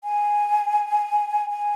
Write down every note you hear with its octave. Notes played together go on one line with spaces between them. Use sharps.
G#5
G#5